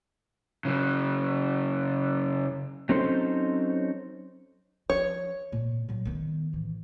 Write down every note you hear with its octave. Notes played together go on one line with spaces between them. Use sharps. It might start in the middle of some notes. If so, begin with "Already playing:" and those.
C#3 F#3
F#3 C4 C#4 D#4 A4 C5
F3 C#5
A#2
A#2 F#3
D#3 B3
A1 E3